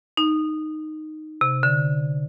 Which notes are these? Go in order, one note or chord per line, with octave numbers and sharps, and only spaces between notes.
D#4
C3
D3